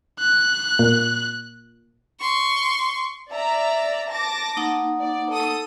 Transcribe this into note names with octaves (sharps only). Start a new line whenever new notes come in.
F#6
A#2
C6 C#6
D5 E5 A#5
A5 D6 A#6
A#3 D#4 F#5
D5
A4 D#6